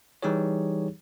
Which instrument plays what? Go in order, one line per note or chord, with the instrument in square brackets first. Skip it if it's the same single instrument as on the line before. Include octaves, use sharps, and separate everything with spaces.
[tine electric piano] E3 G3 D#4 G4 G#4 C#5